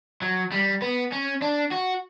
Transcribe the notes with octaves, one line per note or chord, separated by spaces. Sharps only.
F#3
G3
B3
C#4
D4
F#4